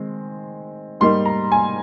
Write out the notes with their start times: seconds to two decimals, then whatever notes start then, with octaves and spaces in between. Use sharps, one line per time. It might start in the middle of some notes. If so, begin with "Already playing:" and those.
Already playing: D#3 G#3 C4
1.00 G#2 G3 A#3 D#4 C6
1.26 A#5
1.52 G#5